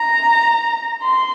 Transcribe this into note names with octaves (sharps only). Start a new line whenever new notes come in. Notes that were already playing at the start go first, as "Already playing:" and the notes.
Already playing: A#5
C6